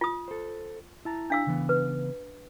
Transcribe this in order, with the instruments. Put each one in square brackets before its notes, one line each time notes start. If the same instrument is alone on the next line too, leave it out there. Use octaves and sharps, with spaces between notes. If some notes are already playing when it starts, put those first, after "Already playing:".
[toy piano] F4 D#6
[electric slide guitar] A4 C5
E4 A5 A#5
[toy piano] D4 F5 E6
[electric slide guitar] C#3 E3 B3
[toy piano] B4